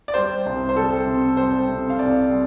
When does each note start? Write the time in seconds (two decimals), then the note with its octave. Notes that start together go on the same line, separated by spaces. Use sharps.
0.08 D5
0.14 G3 C5
0.46 C2
0.69 C5
0.76 G3 A4
1.07 C3
1.37 G3 C5
1.68 C3
1.90 F5
1.98 C2 D5
2.29 G3